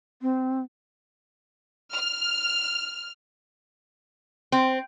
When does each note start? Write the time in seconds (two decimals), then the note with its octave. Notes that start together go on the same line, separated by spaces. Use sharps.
0.22 C4
1.93 F6
4.52 C4